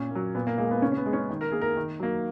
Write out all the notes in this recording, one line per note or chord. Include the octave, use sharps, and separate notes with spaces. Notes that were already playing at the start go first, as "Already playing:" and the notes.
Already playing: A#2 C#4
F#3 A#3
A#2 B3
A#3
G#3 A#3
B3
C#3 C#4
C#4
B3
G#3
C#4
D#3
A#4
A#3 G#4
A#4
D#3
F#3 A#3